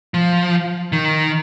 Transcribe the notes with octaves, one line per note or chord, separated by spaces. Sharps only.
F3
D#3